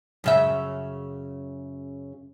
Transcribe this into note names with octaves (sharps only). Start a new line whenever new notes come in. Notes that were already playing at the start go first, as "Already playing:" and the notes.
F#2 C#3 E5